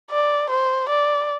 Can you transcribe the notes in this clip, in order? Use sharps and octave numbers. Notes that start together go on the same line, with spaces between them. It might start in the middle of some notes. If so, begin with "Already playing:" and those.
D5
C5
D5